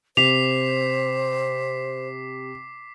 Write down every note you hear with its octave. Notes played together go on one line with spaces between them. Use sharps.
C3 C5 D6 B6 C7 F7